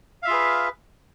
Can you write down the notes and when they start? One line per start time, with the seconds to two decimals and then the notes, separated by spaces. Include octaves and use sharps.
0.22 F5
0.25 E5
0.28 F4
0.30 G#4
0.33 B4